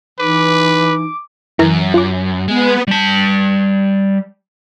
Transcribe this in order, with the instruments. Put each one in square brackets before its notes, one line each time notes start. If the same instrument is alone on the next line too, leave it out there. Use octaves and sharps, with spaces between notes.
[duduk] E3 [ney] D#4 [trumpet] B4 [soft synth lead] D6
[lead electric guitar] F#2 [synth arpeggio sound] E3 A#4 A#5
[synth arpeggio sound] F4 D6
[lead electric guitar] G#3 [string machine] B3
[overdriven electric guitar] G3 A5